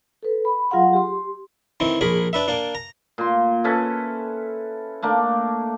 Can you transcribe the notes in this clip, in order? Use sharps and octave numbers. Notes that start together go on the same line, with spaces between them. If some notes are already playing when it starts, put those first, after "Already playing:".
A4 B4
B5
F#3 F4 G#4 F5 F#5 C6
G4 C6
D#3 E3 C4
A#1 G#4 A#4 B5
D4 B4 E5
A#3 D4
A#5
A#2 C6
C#4 E4 A4 B4
A3 A#3 D4